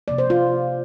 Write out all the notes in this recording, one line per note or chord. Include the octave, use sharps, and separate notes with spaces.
C3 F3 A#3 D5
C5
F4